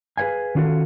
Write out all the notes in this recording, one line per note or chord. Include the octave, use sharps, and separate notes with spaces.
G#4 B4 C#5 F5 G#5
D#3 C#4 F4 F#4 A4